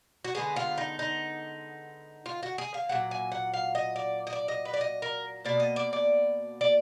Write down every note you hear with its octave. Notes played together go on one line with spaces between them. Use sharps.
F#4
D3 G#3 B3 G#4
F4
D#4
D#4
F4
F#4
G#4
F5
A#2 F#3 F#5
G#5
F#5
F5
D#5
D5
D#5
D5
D#5
B4
D5
D#5
A#4
B2 A#3 D5
D#5
D5
D5
D5